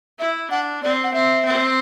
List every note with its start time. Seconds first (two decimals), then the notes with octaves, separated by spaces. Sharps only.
0.19 E4 E5
0.50 D4 F#5
0.83 C4 D5
1.04 F#5
1.14 C4 E5
1.45 C4